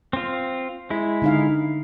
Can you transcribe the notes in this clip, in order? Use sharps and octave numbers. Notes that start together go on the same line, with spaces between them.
C4 F4
G#3 E4
D3 D#4 F5